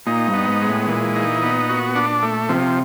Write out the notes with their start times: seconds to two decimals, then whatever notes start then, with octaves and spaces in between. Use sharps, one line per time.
0.07 A#2 D#4
0.28 G2
0.34 B3
0.48 G#2
0.62 G#3
0.68 A2
0.88 A#2 E3
1.16 D#4
1.43 B3
1.69 F#4
1.95 D4
2.22 A3
2.49 C3 F3